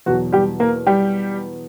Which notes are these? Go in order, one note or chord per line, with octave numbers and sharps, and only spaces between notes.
E2 B2 F#3 F#4
G3 G4
A#3 A#4
G3 G4